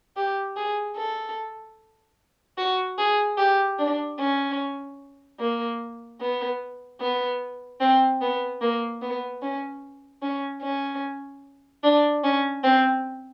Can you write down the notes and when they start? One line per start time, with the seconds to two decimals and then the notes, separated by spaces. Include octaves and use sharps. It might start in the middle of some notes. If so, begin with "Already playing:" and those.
0.16 G4
0.56 G#4
0.97 A4
2.58 F#4
2.98 G#4
3.38 G4
3.79 D4
4.19 C#4
5.39 A#3
6.21 B3
7.01 B3
7.80 C4
8.21 B3
8.61 A#3
9.02 B3
9.42 C#4
10.22 C#4
10.62 C#4
11.83 D4
12.24 C#4
12.64 C4